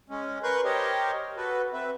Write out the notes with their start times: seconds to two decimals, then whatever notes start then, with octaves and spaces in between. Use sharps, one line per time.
0.10 G#3 C#4
0.43 A#4 B4 C6 C#6 F#6 G6
0.65 G4 A#4 C5 C#5 D#5
1.37 F#4 A4 B4
1.73 C4 B4 E5